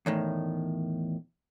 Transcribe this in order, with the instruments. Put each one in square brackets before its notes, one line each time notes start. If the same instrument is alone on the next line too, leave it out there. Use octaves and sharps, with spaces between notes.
[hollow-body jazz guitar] E2 A2 D#3